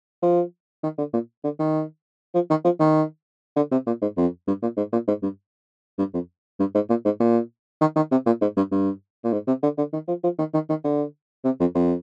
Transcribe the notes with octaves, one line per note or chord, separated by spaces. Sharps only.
F3
D#3
D3
A#2
D3
D#3
F3
D#3
F3
D#3
D3
C3
A#2
G#2
F2
G2
A#2
G#2
A#2
G#2
G2
G2
F2
G2
G#2
A#2
G#2
A#2
D#3
D#3
C3
A#2
G#2
G2
G2
A#2
G#2
C3
D3
D3
D#3
F3
F3
D#3
D#3
D#3
D3
C3
F2
F2